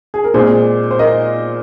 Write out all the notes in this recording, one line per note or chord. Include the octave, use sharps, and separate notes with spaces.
G#4
A#4
A#2 G#3 C4 G#4 C5
C5
A#4 D#5